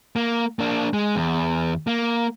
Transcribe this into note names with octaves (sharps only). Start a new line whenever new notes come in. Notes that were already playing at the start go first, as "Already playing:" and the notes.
A#3
A#3 D4
G#3
E2
A#3